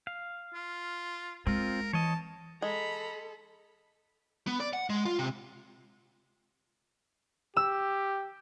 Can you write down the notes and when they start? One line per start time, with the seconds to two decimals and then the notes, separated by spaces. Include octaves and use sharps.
0.07 F5
0.54 F4
1.47 G#3 C4 F4 A#4
1.93 E3 C#5 D#5 A5
2.62 G#3 A4 A#5 B5
4.47 B3
4.60 D5
4.73 F#5
4.90 G#3
5.05 F4
5.19 C3
7.57 G4 E6